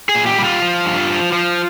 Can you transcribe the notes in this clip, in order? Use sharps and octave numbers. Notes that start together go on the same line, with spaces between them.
G#4
A#2
G4
G3
F4
F3
G2
F3
F3